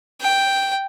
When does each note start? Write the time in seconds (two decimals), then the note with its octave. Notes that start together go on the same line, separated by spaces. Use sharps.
0.21 G5